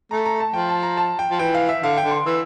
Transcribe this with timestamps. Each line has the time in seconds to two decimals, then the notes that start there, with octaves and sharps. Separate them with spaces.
0.11 A3 A#5
0.26 A#5
0.40 A5
0.54 F3 G5
0.69 A5
0.83 A#5
0.97 A5
1.19 G5
1.31 F3
1.39 E3 G5
1.54 F5
1.69 E5
1.83 D3 F5
1.98 G5
2.04 D3
2.11 C6
2.26 E3 E6